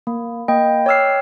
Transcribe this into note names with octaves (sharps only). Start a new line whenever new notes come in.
A#3
A#3 D#5 G5
C#5 G5 D6 E6 F6 C7